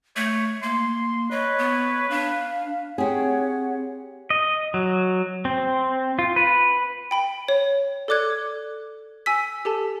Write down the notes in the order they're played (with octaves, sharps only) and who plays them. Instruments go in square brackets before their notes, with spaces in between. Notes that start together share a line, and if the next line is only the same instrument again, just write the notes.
[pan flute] A3 [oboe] C#5
[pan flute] A#3 [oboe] C6
[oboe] B4 [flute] C#5 [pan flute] D#5
[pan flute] B3
[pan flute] D4 [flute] F5
[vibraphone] C4 [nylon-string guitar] G4 G#4 [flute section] C#5 F#5
[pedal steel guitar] D#5
F#3
C4
F4
B4
[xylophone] G5 B5 D7
C#5
A4 D5 D6 F#6 G#6
G#5 E6 B6
G4 A4 A5